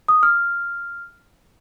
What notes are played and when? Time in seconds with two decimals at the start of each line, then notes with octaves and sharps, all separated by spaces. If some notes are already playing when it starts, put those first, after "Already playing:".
0.08 D#6
0.23 F6